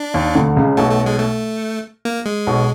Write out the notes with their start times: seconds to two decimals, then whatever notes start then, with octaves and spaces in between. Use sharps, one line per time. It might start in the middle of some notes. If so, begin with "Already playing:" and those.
Already playing: D4
0.14 D#2 D#3
0.35 D2 D3
0.56 C#2 C#3
0.77 B1 B2 A3
0.91 A3
1.06 G#3
1.20 A3
2.05 A#3
2.26 G#3
2.47 B1 B2